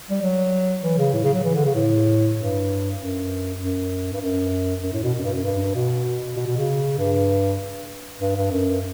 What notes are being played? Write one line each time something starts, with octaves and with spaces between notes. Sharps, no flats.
G3
F#3
E3
C#3
A2
C#3
F#3
E3
D3
C#3
A2
G2
F#2
F#2
G2
F#2
F#2
A2
B2
F#2
G2
F#2
G2
B2
B2
B2
C#3
G2
G2
G2
F#2